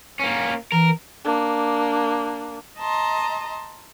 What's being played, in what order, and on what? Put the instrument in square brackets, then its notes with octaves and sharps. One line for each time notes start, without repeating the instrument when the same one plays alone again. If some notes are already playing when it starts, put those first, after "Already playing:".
[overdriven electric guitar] A#3 C#4
[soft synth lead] E3 [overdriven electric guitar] A#4
[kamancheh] A#3 D4
[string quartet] D#5 A5 A#5 C6